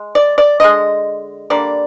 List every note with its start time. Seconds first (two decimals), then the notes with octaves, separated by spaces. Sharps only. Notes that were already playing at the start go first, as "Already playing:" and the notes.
Already playing: G#3
0.15 D5
0.38 D5
0.60 D3 G#3 D#5
1.50 D3 G3 A#3 D5